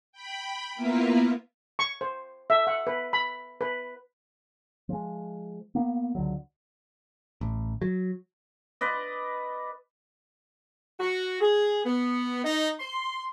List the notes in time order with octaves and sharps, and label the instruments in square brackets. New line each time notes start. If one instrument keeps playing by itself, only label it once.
[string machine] G5 B5
A#3 B3 E4 F4 A#4 B4
[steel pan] C#6
C5
E5
F#5
B4
B5
B4
[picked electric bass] F3 G#3
A#3 B3
C#2 D3 F#3
A1
F#3
[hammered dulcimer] B4 D5 D#5
[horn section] F#4
G#4
B3
D#4
C6